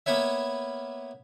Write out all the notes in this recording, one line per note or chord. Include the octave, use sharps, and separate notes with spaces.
A#3 B3 E4 B4 C#5 E5